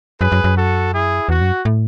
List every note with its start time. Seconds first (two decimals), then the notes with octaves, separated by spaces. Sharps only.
0.20 F#2 G#4 B4
0.32 F#2
0.44 F#2
0.57 F#4 A4
0.92 E4 G#4
1.29 E2 F#4
1.41 F#2
1.65 A2